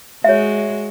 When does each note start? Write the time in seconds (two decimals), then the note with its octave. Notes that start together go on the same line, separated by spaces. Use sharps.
0.24 G#3 F#4 C#5 E5